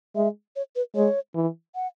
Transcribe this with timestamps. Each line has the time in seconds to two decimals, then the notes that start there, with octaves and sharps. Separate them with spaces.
0.15 G#3 E5
0.56 C#5
0.76 B4
0.95 G#3 C#5
1.35 E3
1.75 F#5